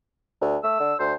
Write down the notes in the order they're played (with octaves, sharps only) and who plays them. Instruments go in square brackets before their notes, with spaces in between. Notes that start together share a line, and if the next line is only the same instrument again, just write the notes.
[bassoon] D2
[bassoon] A3 [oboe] E6
[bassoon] D3
[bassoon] D2 [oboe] C5